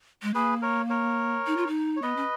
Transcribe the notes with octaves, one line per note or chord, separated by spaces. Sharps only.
G#3
A#3 G#4 B4
A#4 C#5
A#4 C#5
D#4
F4
D#4
C#5
B3 B4 D#5
C#4